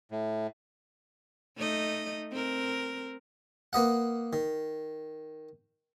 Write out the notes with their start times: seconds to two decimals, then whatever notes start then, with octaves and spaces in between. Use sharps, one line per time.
0.11 A2
1.57 A3 D#4 D#5
2.32 C4 A#4
3.73 A#3 B4 D#5 F#5
4.33 D#3